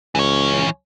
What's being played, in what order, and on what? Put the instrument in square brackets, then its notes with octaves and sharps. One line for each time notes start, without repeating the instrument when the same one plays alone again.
[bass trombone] C#2 [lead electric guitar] E3 C#5